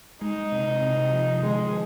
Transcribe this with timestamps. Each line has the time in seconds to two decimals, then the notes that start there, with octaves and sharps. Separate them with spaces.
0.21 G#3 D#4
0.52 C3
0.82 C3
1.12 F3
1.42 D#3 G#3